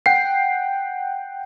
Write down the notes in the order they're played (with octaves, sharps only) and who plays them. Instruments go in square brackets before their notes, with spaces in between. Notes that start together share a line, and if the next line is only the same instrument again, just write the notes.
[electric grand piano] F#5 G5 C7